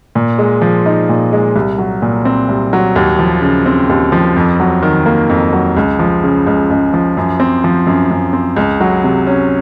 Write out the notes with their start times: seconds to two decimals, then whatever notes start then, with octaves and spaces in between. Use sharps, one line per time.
0.15 A#2
0.39 G#3
0.62 F3
0.86 D#4
1.09 A#2
1.33 G#3
1.56 C2
1.78 F#3
2.02 A#2
2.25 C4
2.49 C2
2.73 F#3
2.96 D#2
3.19 F3
3.42 C#3
3.66 C4
3.89 D#2
4.12 F3
4.36 F2
4.60 F#3
4.83 D#3
5.06 A#3
5.30 F2
5.53 F#3
5.77 C#2
5.99 F3
6.24 C#3
6.47 C#2
6.70 C#2
6.93 F3
7.17 F#2
7.40 C4
7.64 F3
7.87 F#2
8.11 F#2
8.33 C4
8.57 C#2
8.80 F#3
9.04 C3
9.27 C#4